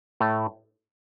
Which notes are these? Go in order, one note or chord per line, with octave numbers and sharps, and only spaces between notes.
A2 A3